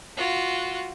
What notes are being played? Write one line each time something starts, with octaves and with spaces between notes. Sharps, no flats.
F4 F#4